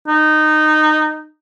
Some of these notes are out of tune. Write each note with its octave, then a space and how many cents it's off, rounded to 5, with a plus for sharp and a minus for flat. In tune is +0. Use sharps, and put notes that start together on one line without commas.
D#4 -15